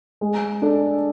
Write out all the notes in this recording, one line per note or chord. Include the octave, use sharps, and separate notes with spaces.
G#3
D4 A4